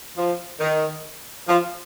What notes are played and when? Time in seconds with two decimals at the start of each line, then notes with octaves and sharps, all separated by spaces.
0.17 F3
0.60 D#3
1.48 F3